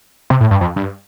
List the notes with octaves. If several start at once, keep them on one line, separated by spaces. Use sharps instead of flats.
C3
A2
G2
F2
G2